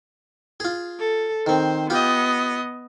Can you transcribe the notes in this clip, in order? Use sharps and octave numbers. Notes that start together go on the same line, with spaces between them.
F4 G#4
A4
D#3 C4 C5
B3 F4 G4 D#5